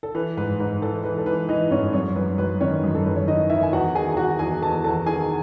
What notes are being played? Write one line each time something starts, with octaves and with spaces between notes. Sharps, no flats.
A4
E3 B4
G#2 B4
G#2 B4
E3 A4
E3 B4
A4
E3 B4
E3 D#4 D#5
G#2 C#4 C#5
F#2 C#4 C#5
F#2 B4
F#2 B4
D#3 C#4 C#5
F#2
A4
F#2 B4
C#5
D#3 D#4 D#5
D#3 E4 E5
G#5
E2 F#4 F#5
D#3 G#4 G#5
G#5
D#3 F#4 F#5
E2 G#4 G#5
E2 A4 A5
E2 A4 A5
D#3 G#4 G#5